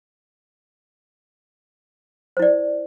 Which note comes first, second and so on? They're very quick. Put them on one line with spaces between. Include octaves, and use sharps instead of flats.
C5 E4 D5